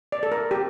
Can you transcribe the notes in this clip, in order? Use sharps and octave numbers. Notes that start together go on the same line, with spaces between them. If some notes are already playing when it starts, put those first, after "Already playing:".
D5
A4
A#4
G4